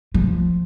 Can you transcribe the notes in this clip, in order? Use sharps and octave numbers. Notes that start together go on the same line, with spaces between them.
F3